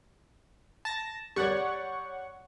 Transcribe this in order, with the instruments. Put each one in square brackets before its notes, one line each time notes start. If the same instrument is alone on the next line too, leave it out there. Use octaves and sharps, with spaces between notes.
[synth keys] A5 A#6
[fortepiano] G3 D5 [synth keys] C#5 F#5 C#6